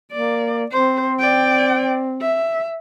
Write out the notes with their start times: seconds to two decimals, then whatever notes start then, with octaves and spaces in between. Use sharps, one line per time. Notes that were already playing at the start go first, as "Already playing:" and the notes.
0.12 A#3 D5
0.71 C4 C5
1.19 D5 G5
2.22 E5